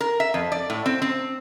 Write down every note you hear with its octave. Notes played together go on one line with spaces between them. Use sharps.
A#4
E5
F2
D5
A2
C4
C4